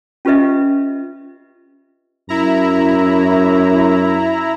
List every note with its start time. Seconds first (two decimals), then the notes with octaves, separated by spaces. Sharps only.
0.25 C#4 F4 G4 B4 D#5 E5
2.29 F#2 E4 A#5